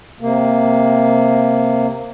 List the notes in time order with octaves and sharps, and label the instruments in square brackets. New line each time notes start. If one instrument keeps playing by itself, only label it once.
[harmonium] C3 A#3